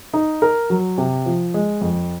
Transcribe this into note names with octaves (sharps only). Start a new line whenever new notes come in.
D#4
A#4
F#3
C3
F3
G#3
F2